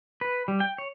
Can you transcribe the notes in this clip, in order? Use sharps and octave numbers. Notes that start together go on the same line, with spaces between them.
B4
G3
G5
C#5